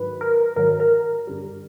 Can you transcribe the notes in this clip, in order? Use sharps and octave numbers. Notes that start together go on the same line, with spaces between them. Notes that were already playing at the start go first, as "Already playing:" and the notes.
Already playing: G#2 D#3 F#3 B4
A#4
G#2 D#3 F#3 A#4
A#4
G2 D3 G3